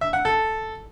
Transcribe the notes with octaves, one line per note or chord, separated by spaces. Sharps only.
E5
F#5
A4